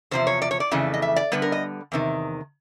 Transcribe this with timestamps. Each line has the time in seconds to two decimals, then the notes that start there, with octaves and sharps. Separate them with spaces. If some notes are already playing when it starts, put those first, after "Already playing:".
0.11 E2 C3 F3 C5
0.27 C#5
0.42 D5
0.51 C#5
0.60 D5
0.71 F2 C#3 E3 A3
0.94 D#5
1.02 E5
1.16 D5
1.32 D3 G3 B3 B4
1.42 A#4
1.52 D#5
1.92 E2 C3 D#3